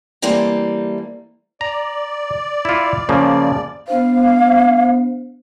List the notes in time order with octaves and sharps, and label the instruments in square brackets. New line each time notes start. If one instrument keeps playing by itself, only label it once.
[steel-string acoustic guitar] E3 G3 A3 A#3 C4
[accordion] D5 [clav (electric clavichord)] A#5
[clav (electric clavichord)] E4 F4
C#3 F3 A#3
[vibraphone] B3 D4 C5 [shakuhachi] F5